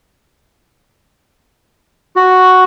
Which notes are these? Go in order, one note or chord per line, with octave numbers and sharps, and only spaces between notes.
F#4